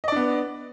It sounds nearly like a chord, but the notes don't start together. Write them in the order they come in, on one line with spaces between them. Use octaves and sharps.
D#5 D5 D4 B3